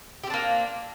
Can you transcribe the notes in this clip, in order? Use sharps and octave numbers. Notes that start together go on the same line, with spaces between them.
A#3 C4 D4 G4